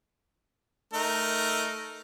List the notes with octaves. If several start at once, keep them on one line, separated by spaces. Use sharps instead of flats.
A3 D#4 A#4